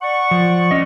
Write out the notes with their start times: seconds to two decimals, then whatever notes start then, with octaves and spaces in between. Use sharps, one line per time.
0.02 D5 F#5 C#6
0.31 F3
0.71 C#4 D#5